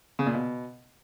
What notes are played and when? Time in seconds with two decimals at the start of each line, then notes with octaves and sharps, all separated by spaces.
0.19 C#3
0.26 A#2
0.34 B2